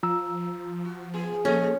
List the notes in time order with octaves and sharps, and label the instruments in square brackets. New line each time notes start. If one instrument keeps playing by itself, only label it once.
[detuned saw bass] F3 [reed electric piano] F4 A#5 E6
[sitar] F#4
B3 G#4
[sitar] A#2 G#3 D#5 [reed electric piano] A#3 A4 [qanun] C#4